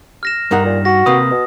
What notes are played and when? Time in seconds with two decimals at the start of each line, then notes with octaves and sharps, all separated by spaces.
0.23 F6 A#6 E7
0.51 G2 D#4 A#4 F#5
0.65 A#2
0.85 F#4 A#6
1.06 C3 A#3 B4 D#6
1.31 B2